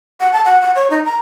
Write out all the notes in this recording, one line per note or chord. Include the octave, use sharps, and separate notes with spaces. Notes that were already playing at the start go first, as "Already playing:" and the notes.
F#5
A5
F#5
F#5
C#5
D#4
A#5